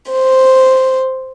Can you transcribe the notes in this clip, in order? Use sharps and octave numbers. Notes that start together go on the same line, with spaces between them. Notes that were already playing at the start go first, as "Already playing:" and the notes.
C5